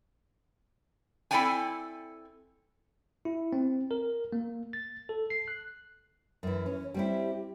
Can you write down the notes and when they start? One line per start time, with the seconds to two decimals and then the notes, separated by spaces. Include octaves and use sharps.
1.31 C4 E4 A4 D5 G5 G#5
3.25 E4
3.53 C4
3.91 A#4
4.33 A#3
4.73 A6
5.09 A4
5.30 C7
5.48 F#6
6.43 F#2 E3
6.66 C#4 C#5
6.94 G3 C4 E4 G4